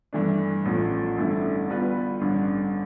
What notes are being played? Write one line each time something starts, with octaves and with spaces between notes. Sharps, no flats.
G2 E3 A3 D4
A1 A2 F3
A1 G2 D3 A3 E4
D3 G3 B3 F4 B4
A1 G2 D3